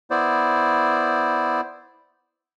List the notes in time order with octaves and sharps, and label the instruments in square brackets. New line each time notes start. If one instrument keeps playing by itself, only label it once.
[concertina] B3 E4 C5 D5